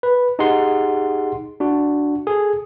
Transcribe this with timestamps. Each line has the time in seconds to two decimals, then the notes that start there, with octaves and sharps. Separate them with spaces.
0.03 B4
0.39 D#4 G4 G#4 F#5 C6
1.60 D4 F#4
2.27 G#4 A4